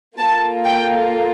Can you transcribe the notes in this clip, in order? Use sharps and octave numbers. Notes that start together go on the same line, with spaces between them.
A#3 F4 A4 A5
G5